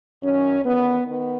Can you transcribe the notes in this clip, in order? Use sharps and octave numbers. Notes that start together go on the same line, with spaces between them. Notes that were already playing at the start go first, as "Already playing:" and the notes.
F#2 D#3 C#4
E2 D#3 B3
D#3 B3